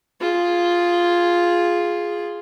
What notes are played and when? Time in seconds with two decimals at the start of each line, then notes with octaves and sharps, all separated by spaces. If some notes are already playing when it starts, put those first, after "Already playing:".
0.21 F4 G#4